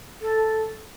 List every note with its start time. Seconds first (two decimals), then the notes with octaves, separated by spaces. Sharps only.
0.22 A4